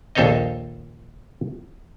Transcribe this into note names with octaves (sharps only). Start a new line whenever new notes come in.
A#1 D#2 A4 C5 C#5 D#5